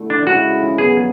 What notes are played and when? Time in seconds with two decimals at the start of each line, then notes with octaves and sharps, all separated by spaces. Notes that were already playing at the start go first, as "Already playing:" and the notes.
Already playing: D3 A3 E4
0.10 D4
0.26 D2 C#3 G#3 C#4 E4 F#4
0.78 D2 C#3 F#3 B3 G#4